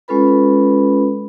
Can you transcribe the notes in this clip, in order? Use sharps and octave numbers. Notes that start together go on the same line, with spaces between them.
G#3 C#4 F4 A4 B4 B5